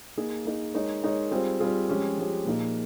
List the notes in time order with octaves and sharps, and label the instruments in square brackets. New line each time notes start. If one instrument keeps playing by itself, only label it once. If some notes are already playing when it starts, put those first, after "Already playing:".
[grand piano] A#3 D#4 G#4
A#3 D#4 G#4
G#3 D#4 A#4 C#5
G#3 D#4 A#4 C#5
G3 C4 F4 G#4
G3 C4 F4 G#4
F3 G#3 C#4 G4
F3 G#3 C#4 G4
A#2 F3 A#3 D#4 G#4